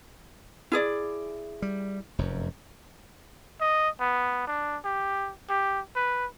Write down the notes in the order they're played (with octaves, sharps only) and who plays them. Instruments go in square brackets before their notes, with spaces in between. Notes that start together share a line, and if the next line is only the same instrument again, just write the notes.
[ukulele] E4 G#4 D5
[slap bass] G3
F1 F#2
[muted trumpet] D#5
B3
D4
G4
G4
B4